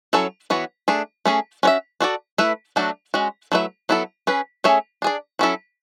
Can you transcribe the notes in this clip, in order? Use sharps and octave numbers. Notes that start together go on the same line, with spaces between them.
F#3 C#4 E4 A4 C#5
E3 B3 F#4 C#5
A3 D4 G#4
A3 C#4 G#4
C#4 F#4 C#5 E5
D4 F#4 A4 D5
A3 E4 B4 E5
F#3 A3 D4 F#4
G#3 C#4 F#4
F#3 A3 E4 B4 E5
F#3 B3 E4 A4
C#4 G#4 B4
A3 C#4 G#4 C#5 E5
D4 G#4 D5
F#3 C#4 E4 A4